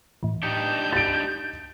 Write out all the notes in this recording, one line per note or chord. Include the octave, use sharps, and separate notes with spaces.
A2 E3
D4 D#4 G4 G6 C#7
A6 D7